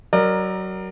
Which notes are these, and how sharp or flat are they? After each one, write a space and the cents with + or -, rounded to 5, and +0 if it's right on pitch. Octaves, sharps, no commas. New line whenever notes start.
F#3 +25 A#4 +0 D5 +40